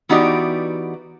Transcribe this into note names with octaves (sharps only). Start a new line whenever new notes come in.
E3 B3 D#4 F#4 G4 D5